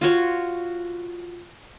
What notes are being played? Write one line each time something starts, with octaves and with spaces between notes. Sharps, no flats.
F4 F#4 C#5